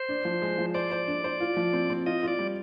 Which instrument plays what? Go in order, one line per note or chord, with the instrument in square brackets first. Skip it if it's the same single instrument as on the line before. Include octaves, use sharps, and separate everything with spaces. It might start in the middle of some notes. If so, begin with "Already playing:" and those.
Already playing: [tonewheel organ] C5
[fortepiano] D4
F3
G#3
F3
[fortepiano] C5 [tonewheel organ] D5
[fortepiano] C5
D4
C5
F4
F3
C4
C4
[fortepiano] F4 [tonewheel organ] D#5
[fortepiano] F4 [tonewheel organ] D5
[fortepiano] G3